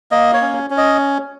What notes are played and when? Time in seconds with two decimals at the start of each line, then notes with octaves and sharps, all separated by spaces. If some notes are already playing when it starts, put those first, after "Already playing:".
0.11 A#3 D#5
0.33 C#5
0.41 C#4
0.70 C#4
0.77 D#5